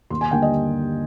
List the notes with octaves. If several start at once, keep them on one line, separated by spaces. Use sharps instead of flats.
D#2 C6
G#5
D3 G3 A#3 G5
D#5